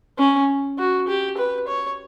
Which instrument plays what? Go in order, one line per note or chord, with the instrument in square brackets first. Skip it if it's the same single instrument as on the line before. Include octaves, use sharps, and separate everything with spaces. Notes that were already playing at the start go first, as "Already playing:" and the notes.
[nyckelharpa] C#4
F#4
G4
B4
C#5